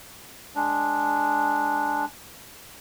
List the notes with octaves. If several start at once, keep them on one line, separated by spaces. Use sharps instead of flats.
G#3 D4